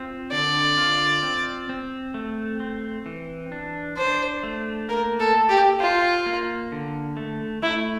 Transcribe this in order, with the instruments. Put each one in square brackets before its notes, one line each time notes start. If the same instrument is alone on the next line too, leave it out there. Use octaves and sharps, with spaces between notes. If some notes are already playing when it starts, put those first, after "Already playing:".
Already playing: [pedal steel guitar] C4 F4
[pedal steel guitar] D3 [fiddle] D5
[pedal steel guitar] F4
C4
C4
A3
C4
E3
D4
[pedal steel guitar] D4 [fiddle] C5
[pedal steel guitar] A3
[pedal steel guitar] A#3 [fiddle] A#4
[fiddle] A4
[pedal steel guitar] A4
[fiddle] G4
[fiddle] F4 [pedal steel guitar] C5
[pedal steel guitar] A#3
D3
A3
[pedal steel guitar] A3 [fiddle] E4